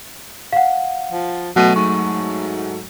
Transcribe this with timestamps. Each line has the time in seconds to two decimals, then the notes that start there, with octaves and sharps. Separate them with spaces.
0.53 F5 F#5
1.12 F3
1.56 B2 F#3 A3 D#7
1.76 G#2 C#6